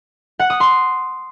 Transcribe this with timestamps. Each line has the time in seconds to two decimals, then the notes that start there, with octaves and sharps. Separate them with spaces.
0.39 F#5
0.50 D#6
0.60 C6